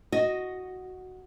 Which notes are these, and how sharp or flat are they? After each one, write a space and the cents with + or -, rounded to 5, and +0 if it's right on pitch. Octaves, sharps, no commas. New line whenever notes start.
F#4 +0 D#5 +0